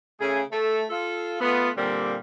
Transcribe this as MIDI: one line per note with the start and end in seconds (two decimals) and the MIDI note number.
0.20 0.41 49
0.20 0.41 57
0.20 0.41 68
0.51 0.84 57
0.90 1.40 65
0.90 1.40 69
1.41 1.70 57
1.41 1.70 59
1.41 1.70 65
1.77 2.16 46
1.77 2.16 50
1.77 2.16 55
1.77 2.16 58
1.77 2.16 60